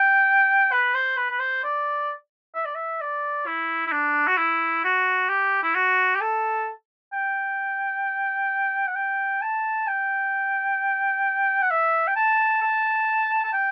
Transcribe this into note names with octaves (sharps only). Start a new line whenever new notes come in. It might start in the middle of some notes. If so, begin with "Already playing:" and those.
Already playing: G5
B4
C5
B4
B4
C5
D5
E5
D5
E5
D5
E4
E4
D4
F#4
E4
F#4
G4
E4
F#4
G4
A4
G5
F#5
G5
A5
G5
F#5
E5
G5
A5
A5
A5
G5